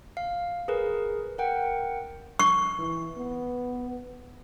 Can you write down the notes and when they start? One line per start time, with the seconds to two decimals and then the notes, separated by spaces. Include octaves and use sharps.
0.17 F5
0.68 G#4 A#4 B4
1.38 A#4 F#5 G5
2.39 C#6
2.79 E3
3.17 B3